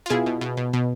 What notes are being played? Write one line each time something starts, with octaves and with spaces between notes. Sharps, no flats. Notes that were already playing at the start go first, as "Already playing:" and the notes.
F4
B2 E4 G#4
B2
B2
B2
B2